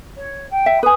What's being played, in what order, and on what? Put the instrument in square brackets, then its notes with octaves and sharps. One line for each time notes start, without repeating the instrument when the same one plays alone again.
[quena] C#5
G5
[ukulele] E5
[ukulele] B4 G#5 [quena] D#6